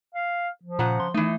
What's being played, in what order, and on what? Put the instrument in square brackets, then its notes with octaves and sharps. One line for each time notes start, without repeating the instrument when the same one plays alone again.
[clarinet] F5
F3
[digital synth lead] A#2 [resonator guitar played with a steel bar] C#3 F#5 A#5
[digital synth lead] C6
[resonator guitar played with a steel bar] E3 D#4 [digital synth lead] A3